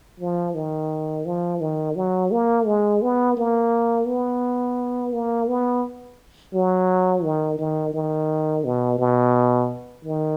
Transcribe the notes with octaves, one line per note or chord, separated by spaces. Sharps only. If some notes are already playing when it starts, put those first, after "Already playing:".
F3
D#3
F3
D#3
F#3
A#3
G#3
B3
A#3
B3
A#3
B3
F#3
D#3
D#3
D#3
B2
B2
D#3